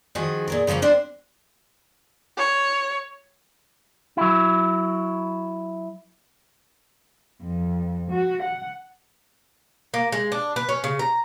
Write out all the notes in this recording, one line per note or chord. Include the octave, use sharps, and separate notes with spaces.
D#3 F3 F#4 G#4
A#2 G#4 A#4
C#3 F3 A3 A#3 C#4
C4 D4 C5
C#5
F#3 E4
F2
F#4
F#5
A#3
G#3
D4
B4
C#4
C#3
A#5